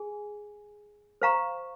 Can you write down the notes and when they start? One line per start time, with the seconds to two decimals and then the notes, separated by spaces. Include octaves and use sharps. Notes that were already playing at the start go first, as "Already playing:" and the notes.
Already playing: G#4 G#5
1.22 C5 F5 A#5 C#6